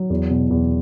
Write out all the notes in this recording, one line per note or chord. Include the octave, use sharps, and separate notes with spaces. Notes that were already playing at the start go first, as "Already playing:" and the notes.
Already playing: F#3
E2
B2
E2